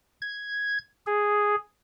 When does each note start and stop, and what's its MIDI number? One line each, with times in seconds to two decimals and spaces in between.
0.21 0.78 92
1.06 1.55 68